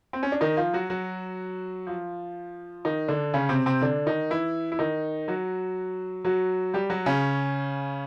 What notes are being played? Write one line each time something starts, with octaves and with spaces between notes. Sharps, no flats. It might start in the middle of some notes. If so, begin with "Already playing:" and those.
C4
C#4
D4
D#3 D#4
F3 F4
F#3 F#4
F#3 F#4
F3 F4
D#3 D#4
D3 D4
C#3 C#4
C3 C4
C3 C4
D3 D4
D#3 D#4
E3 E4
E4
D#3 D#4
F#3 F#4
F#3 F#4
G3 G4
F#3 F#4
C#3 C#4